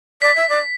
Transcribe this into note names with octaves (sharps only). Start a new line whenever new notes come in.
D5 B6
E5
D5